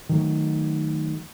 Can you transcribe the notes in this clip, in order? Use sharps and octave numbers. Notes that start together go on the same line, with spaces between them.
D#3 F#3 A3